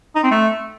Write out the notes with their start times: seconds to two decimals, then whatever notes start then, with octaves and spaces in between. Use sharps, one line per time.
0.16 D#4
0.23 C4
0.31 A3